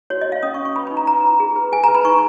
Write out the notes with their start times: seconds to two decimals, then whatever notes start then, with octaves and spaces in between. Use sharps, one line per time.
0.10 F#4 C#5
0.21 D#5
0.27 F#4
0.32 F5
0.43 C#4 D#6
0.54 C#6
0.59 C#4
0.65 C#6
0.76 B4 B5
0.87 D#4 B5
0.97 A#5
1.07 B4 A#5
1.25 F4
1.40 G#4
1.56 B4
1.72 G#4 G#5
1.84 B4 A#5
1.95 B5
2.05 D#4 C#6